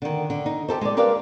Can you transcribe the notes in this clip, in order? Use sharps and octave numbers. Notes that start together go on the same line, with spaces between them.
D3 D#3
D3
D#4
G4 A4 C5
G#3 D5
G4 A#4 B4 D5 F5